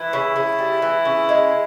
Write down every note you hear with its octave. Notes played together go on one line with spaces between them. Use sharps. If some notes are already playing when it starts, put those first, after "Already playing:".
Already playing: E3 E4
C#3
C#3
G3
E3
C#3
G#3